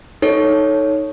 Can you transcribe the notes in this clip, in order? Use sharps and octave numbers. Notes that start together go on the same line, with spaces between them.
D#4 A4 C#5